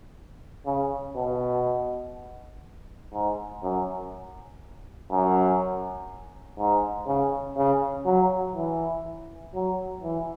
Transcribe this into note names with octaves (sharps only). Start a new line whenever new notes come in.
C#3
B2
G#2
F#2
F#2
G#2
C#3
C#3
F#3
E3
F#3
E3